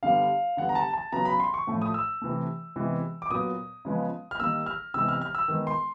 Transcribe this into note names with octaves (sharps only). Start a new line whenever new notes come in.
D3 G3 B3 F5
D3 G3 B3 F#5
A#5
A5
A5
C#3 F#3 B3 A#5
B5
C6
C#6
A2 F3 A3
D#6
E6
C3 E3 A3
C3 E3 G#3 B3
D6
A#2 F#3 B3 D#6
C#3 F3 G#3 B3
F6
D#3 G3 A#3 E6
F6
C3 E3 G#3 B3 E6
F6
F6
E6
D#3 G#3 B3
C6